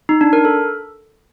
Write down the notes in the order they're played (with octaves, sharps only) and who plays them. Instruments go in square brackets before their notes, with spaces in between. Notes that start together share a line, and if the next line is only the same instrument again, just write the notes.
[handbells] D#4
D4
A#4
A4